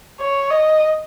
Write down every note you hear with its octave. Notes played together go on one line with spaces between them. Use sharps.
C#5
D#5